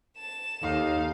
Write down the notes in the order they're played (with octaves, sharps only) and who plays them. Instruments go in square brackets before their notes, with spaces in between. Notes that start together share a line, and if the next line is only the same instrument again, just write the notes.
[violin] A5 E7
[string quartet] D#2 [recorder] D#4 [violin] A4 [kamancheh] F5